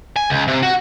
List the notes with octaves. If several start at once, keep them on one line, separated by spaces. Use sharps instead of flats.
G#5
C#2
C3
F#4